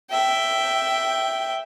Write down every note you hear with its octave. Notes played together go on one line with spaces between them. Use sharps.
E5 G5